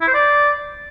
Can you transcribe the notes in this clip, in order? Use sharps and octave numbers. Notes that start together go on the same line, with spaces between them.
E4
C5
D5